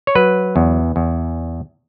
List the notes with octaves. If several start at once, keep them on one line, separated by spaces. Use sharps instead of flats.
C#5
F#3 B4
E2
E2